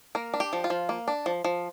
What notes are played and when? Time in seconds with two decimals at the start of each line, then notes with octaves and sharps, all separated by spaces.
0.15 A#3 A#4
0.34 D4
0.40 G4
0.53 F3
0.64 F4
0.70 F3
0.89 A#3
1.08 D4
1.26 F3
1.44 F3